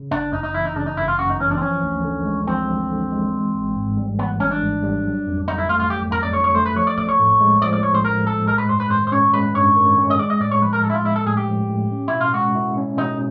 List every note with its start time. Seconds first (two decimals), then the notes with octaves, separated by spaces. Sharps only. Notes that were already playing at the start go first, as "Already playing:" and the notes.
Already playing: C#3
0.11 G1 D4
0.32 F#2 D#4
0.43 D#4
0.54 E3 E4
0.65 D#4
0.76 C#3 D4
0.86 D#4
0.97 G1 E4
1.08 F4
1.19 F#2 F#4
1.30 D#4
1.40 E3 C#4
1.51 D4
1.57 C4
1.61 F3 C#4
1.83 D2
2.04 D3
2.26 G#3
2.47 F3 C4
2.69 D2
2.90 D3
3.12 G#3
3.33 E3
3.55 G#1
3.75 G#2
3.97 G3
4.19 E3 B3
4.40 G#1 C#4
4.51 D4
4.62 G#2
4.83 G3
5.04 F#3
5.26 F2
5.48 D3 D#4
5.58 E4
5.69 A3 F4
5.80 F4
5.90 F#3 G4
6.12 F2 A#4
6.23 D5
6.33 D3 C#5
6.44 C#5
6.55 A3 C5
6.66 B4
6.76 F3 C#5
6.87 D5
6.98 A#1 D5
7.09 C#5
7.19 A2
7.40 G#3
7.62 F3 D5
7.73 D5
7.83 A#1 C#5
7.94 C5
8.05 A2 A#4
8.27 G#3 A4
8.47 G#3 A#4
8.58 B4
8.69 G2 C5
8.80 B4
8.90 D#3 C5
9.07 C5
9.12 C#4 C#5
9.34 G#3 B4
9.55 G2 C#5
9.76 D#3
9.97 C#4
10.10 D#5
10.19 G#3 D5
10.30 D#5
10.41 A2 D5
10.51 C#5
10.62 F3 B4
10.73 A#4
10.84 A2 A4
10.90 E4
10.94 F4
11.04 G#3 E4
11.16 A4
11.26 A2 G#4
11.37 G4
11.48 F3
11.69 A2
11.91 C#4
12.08 B2 E4
12.21 F4
12.34 G#3 F#4
12.55 E4
12.77 C#4
12.98 B2 D#4